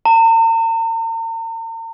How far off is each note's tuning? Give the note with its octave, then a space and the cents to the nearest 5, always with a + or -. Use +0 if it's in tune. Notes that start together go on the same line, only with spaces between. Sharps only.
A#5 -45